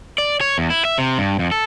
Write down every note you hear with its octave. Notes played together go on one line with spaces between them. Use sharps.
D5
C#5
E2
E4
E5
C3
G2
F2
A4